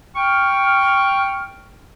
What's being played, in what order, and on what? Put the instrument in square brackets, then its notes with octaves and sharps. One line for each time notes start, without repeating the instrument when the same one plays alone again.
[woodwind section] G5 C#6 F6